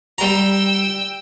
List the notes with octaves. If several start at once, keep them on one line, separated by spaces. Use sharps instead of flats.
G3 G5 A#5 E6